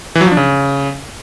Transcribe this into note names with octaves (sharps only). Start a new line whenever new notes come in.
E3
F#3
F3
D4
C#3